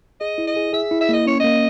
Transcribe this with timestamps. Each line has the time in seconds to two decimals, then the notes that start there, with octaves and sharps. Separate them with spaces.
0.20 G#4 D#5
0.38 E4
0.47 D#5
0.56 G#4
0.73 G#4 E5
0.91 E4
1.01 E5
1.09 A#3 D#5
1.27 C#4 C#5
1.40 A#3 D#5